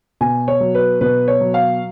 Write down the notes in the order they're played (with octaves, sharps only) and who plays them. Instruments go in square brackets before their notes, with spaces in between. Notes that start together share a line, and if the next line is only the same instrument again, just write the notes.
[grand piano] B2 G#5
C#5
F#3
B4
B2 B4
C#5
F#3
F5